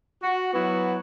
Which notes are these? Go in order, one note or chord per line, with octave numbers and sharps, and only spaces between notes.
F#4
F#3 B3 E4 F#4